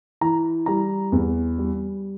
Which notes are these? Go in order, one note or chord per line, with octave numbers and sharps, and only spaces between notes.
E3 A#5
G3 A#5
E2
G3